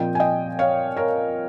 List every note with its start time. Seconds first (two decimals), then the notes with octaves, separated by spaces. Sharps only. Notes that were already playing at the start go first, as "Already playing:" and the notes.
Already playing: A#2 F3 C4 D#5 G5
0.15 G#5
0.20 D#5 G5
0.59 C#5 F5
0.96 A#4 C#5